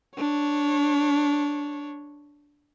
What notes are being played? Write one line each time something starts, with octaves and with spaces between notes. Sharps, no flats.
D4 C#5